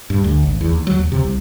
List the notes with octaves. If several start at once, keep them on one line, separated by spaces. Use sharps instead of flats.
G2
D2
G#1
E2
D#2
F#3
D#2
C3
C2